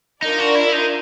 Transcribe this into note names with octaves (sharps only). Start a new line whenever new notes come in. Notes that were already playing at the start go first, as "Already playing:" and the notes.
D4 D#4 F4 A#4 D5
F#4
E4
D#4